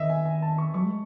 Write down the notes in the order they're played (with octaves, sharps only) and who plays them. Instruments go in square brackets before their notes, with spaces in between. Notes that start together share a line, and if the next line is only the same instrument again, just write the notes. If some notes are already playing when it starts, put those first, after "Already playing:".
Already playing: [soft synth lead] D#3 [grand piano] D#5 E5
[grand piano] G#5
G#5
A5
C#6
[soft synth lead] F#3 [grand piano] C#6
[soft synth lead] G#3